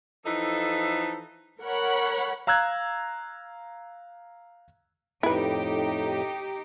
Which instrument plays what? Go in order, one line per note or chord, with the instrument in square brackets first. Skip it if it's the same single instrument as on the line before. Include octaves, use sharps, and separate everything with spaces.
[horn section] E3 F3 D#4 A4
[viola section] A#4 C#5 F#5 B5
[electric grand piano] F5 A#5 E6 F#6 G#6
[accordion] F2 A2 [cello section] D#4 G4 [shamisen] E4 B4